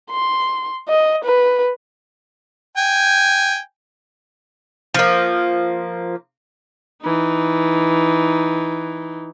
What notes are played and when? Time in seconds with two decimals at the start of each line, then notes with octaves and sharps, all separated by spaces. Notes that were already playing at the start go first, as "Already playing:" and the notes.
0.11 C6
0.89 D#5
1.25 B4
2.77 G5 G#5
4.94 F3 A#3
7.03 E3 D#4